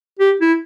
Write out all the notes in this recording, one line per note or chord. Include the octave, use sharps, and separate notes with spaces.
G4
E4